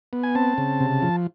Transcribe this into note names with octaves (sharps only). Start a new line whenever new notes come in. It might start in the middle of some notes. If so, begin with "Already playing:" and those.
B3
G#5
C4 A5
C#3
C3
F3